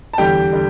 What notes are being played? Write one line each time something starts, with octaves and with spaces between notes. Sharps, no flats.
A5
E2 D3 G3 G4 G5
D3 G3